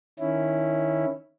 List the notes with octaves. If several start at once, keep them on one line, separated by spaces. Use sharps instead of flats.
D#3 C#4 E4